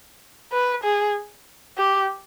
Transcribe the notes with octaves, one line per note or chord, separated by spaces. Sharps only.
B4
G#4
G4